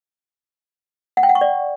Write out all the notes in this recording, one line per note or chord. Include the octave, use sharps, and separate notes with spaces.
F#5
G5
F#5
C#6
D5